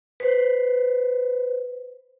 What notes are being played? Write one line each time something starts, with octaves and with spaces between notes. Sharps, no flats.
B4 C5